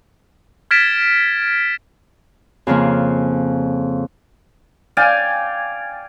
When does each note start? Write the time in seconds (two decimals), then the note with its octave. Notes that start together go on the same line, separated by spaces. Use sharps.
0.71 F6 G#6 A6 B6 D7 E7
2.67 F2 C#3 F3 A#3
4.97 D5 F5 G5 G#5